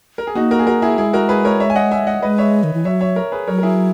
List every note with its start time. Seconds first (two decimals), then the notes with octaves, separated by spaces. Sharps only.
0.18 A#4
0.27 G#4
0.35 A#3 D#4 F#4
0.51 F#4 A#4
0.59 G#4
0.66 F#4 A#4
0.82 E4 G#4
0.98 G#3 E4 G#4
1.13 F#4 A#4
1.29 G#4 B4
1.45 A#4 C#5
1.60 C#5 E5
1.70 G#5
1.75 D#5 F#5
1.91 E5 G#5
2.07 D#5 F#5
2.22 G#3 B4 D#5
2.38 C#5 E5
2.64 D#3
2.74 E3
2.85 F#3 C#5 E5
3.01 C#5 E5
3.16 A#4 C#5
3.32 G#4 B4
3.47 F#3 A#4 C#5
3.58 A#4
3.63 E4 G#4